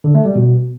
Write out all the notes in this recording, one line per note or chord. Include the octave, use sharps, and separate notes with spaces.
D3
A3
G3
B2